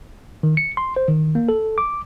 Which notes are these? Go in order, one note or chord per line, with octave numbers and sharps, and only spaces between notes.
D#3
C#7
C6
C5
D#3
A#3
A4
D6